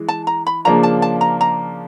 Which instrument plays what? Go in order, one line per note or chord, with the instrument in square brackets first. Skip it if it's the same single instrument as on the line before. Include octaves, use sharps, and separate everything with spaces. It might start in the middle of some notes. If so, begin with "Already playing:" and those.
Already playing: [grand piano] E3 G#3
[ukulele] A5
A#5
B5
[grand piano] C#3 F3 A#3 D4 F4 [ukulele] A#5
[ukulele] A5
A5
A#5
A#5